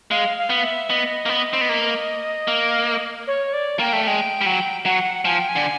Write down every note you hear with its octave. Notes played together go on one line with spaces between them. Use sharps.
G#3 F5
F5
B3
E5
B3 D#5
A#3
B3
C4
B3
A#3
A#3
C#5
D5
A#3 G5
A3
G#3 G5
G3
F#3
F#3 F#5
F3 G#5
G5
G#5
D3